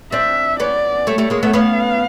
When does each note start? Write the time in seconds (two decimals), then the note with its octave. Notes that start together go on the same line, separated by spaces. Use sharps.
0.12 C4 D4 E5
0.60 B3 C#4 D5
1.07 G3 A3 C#5
1.18 G3 A3
1.30 G#3 A#3
1.43 A3 B3
1.53 B3 C#4 F5